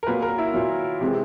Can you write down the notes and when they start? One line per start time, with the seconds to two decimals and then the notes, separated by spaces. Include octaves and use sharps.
0.03 A#4
0.07 A#2 F#3 A#3 B4
0.22 A#4
0.38 E4
0.54 A#2 F#3 A#3
1.01 C3 E3 G#3 C4